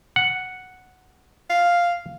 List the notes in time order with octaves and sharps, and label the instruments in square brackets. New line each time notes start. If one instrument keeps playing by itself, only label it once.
[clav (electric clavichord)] F#5
[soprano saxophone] F5